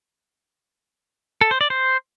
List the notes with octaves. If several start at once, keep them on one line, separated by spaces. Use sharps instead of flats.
A4
C5
D5
C5